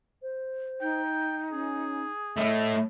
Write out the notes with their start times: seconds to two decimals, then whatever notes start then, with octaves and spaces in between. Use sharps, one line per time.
0.22 C5
0.81 D#4 G5
1.52 C#4 G#4
2.37 A2 A3 D#5 E5